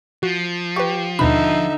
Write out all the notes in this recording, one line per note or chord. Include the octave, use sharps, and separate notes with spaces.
F3 F#4
G4 B4 C#6
D#2 B2 D3 D#4 E5 B5